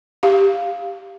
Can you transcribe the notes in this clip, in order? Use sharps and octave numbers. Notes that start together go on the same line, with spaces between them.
G4 F5